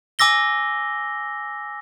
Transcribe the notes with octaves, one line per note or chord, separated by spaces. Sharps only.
G#5 D6 E6 A#6 G7